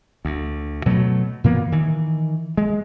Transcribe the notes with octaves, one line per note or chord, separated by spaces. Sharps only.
D2
B2 F#3 G3 A3
A#2 E3 A#3 B3
D#3 E3
G#3